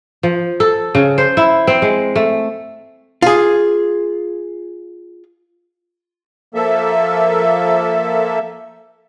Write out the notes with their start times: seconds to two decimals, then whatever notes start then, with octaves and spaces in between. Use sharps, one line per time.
0.23 F3
0.60 A4
0.95 C#3
1.18 C5
1.37 E4
1.67 C4
1.82 G#3
2.16 A3
3.22 F4 G#4
6.54 F3 A#3 A4 E5